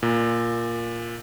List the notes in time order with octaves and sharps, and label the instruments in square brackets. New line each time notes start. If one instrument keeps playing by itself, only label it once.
[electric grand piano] A#2